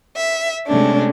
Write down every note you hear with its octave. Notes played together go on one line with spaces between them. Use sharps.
E5
C3 G#3 A3 C#4 D4